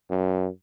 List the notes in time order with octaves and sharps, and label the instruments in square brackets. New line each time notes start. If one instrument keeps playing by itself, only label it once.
[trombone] F#2